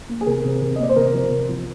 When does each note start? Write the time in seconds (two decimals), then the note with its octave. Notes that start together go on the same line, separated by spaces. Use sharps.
0.09 A#3
0.21 G#4
0.26 C3 A#4
0.44 C3
0.62 C3
0.76 D#5
0.79 A#3 D5
0.89 C5
0.96 C3 A#4
1.13 F3
1.31 C3
1.49 F3